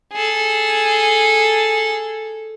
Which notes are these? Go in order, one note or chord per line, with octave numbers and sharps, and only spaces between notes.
G#4 A4